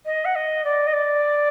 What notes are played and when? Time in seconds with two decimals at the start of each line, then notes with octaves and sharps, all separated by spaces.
0.06 D#5
0.25 F#5
0.35 D#5
0.64 D5
0.87 D#5
0.93 D5